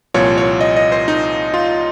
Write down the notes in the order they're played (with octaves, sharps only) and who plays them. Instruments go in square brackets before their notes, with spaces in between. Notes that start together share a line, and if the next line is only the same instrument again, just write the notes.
[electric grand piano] C2 A#2 F3 C#5
C#5
D#5
D#5
C5
D#4
F4